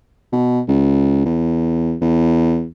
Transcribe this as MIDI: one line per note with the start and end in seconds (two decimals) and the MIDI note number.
0.32 0.61 47
0.68 1.22 37
1.25 1.96 40
2.02 2.66 40